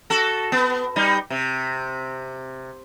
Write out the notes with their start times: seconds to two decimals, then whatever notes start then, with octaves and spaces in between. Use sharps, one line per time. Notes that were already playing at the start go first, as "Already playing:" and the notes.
0.10 F#4 A4
0.52 B3
0.96 G3 D#4
1.30 C3